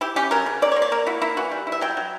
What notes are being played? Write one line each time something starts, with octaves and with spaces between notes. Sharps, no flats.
E4 G4
C#4 G4
F#3 A#4
C#3
A#3 D5
C#5
A#3
D5
A#3 A#4
E4 F#4
A#3 E4
E3 F#4
G3
E4
E5
F#3 G5
F#3